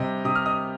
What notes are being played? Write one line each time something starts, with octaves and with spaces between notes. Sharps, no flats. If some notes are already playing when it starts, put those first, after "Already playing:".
Already playing: C3 G3 D#5
C3 D#6
F6
D#5 D#6